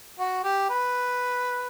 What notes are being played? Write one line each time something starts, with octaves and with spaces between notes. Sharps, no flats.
F#4
G4
B4